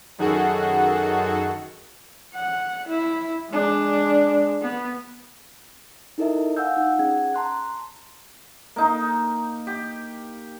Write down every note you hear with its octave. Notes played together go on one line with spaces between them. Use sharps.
F#2 D#3 F#4 G#4 A4 F#5
F#5
E4
G#3 D4
B3
D#4 E4 A4 A#4 D#5 E5
F5 F#5 G#5 E6 G6
D#4 F4 F#5
C#4 G#4 F#5 G5 G#6
A5 A#5 C6 F#6
A#3 D#4
G4